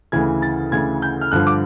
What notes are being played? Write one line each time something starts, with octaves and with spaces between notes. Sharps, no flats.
D2 C#3 E3 G#6
A6
D2 C#3 E3 G#6
G6
F6
G2 D3 F3 F#6
D6